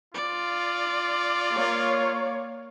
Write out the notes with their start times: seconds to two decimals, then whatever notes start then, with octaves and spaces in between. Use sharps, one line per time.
0.15 F4 D5
1.53 A#3 C#5 F5